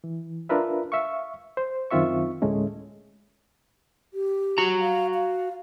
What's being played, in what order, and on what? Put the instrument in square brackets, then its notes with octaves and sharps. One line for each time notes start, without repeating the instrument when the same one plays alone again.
[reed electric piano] E3
D4 F4 A#4 B4 E5
E5 F5 C#6
C5
F#2 D#3 C4 F4 E5 C#6
D2 A2 G#3 A3 C#4
[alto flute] G4
[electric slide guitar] F#4 A#5
[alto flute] F5
F5